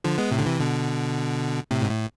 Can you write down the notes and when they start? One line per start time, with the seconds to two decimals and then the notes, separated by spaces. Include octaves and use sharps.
0.04 D3 F3
0.18 G#3 B3
0.31 A2 C3
0.38 D3
0.46 C3 E3
0.59 B2 D3
1.71 A2 C3
1.82 G#2
1.89 A2